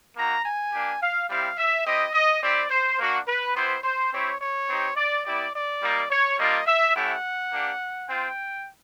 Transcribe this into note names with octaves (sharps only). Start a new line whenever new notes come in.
A#3 D#4 F#4 A#5
G#5
A#3 D4 G4
F5
G3 C4 E4 G4 F5
E5
C4 E4 G4 D#5
D#5
C4 E4 G4 D5
C5
A#3 D4 F#4
B4
B3 E4 G4 C5
C5
C4 E4 G4 C#5
C#5
C4 D#4 G4
D5
B3 E4 G4 D5
D5
G3 A#3 D#4
C#5
G3 A#3 D4 F4 D#5
E5
A3 C#4 E4 G4 F#5
A#3 D4 G4
C4 F4 G5